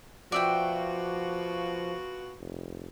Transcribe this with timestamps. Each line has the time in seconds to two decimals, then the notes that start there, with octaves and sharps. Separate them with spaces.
0.32 B2 F3 F4 F#4 D5 E5 G5
2.40 F1